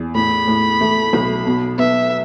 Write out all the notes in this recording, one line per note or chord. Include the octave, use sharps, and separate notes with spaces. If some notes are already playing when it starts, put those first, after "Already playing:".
Already playing: E2
A2 B5
A2
A3
B1
B2
B3 E5